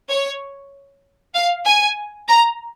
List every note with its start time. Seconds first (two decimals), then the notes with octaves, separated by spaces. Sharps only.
0.09 C#5
1.35 F5
1.65 G#5
2.28 A#5